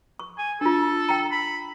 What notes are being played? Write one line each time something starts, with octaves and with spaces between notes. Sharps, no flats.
C#6
G#5
D4 F4 A4
G5 A#5
B5